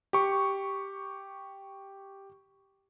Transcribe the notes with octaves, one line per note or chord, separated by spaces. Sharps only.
G4 C#6